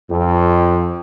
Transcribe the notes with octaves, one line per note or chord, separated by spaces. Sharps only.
F2